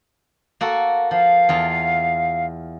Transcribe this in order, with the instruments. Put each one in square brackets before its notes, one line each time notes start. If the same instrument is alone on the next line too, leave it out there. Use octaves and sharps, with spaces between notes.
[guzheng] A#3 F#4 A4
[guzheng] F3 [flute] F5
[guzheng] E2 F4 A5